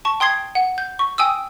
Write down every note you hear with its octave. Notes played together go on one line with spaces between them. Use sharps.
A5 C#6
G5 C6 D#6 G#6 C7
F#5
G6
C#6
G5 G#5 D#6 E6